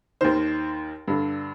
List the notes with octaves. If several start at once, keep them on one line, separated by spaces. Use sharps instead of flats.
D#2 D#3 C5
G2 D3